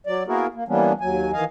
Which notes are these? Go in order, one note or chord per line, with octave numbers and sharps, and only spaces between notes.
F#3 D5
A#3 B3 E4 F#4 G#4 A#4
A#3
E3 G3 A#3 B3 C#4 D4
D#2 F#3 G#5
D#3 E3 D#5 F5 G#5